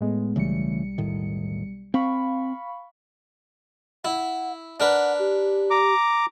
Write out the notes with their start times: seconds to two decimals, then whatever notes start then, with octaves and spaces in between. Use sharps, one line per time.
0.01 A2 G#3 B3
0.36 B1 C#3 E3 G3 A3 C#7
0.98 E1 A2 D#3
1.94 C4 F5 B5 C#6
4.05 E4 F#5
4.80 D4 A#4 B4 F#5
5.19 G4
5.70 A#5 D6